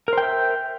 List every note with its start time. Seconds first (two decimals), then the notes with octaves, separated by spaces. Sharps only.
0.08 A#4
0.13 C5
0.18 G5
0.22 E5